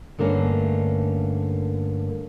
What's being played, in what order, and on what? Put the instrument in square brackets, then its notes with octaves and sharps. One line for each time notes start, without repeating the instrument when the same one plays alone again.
[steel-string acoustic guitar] G2 D3 A3 A#3 C#4